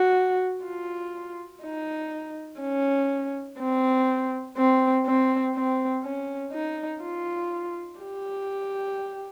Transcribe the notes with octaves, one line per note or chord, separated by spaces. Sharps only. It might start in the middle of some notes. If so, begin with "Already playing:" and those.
Already playing: F#4
F4
D#4
C#4
C4
C4
C4
C4
C#4
D#4
F4
G4